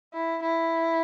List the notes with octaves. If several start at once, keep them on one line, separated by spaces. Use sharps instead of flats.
E4
E4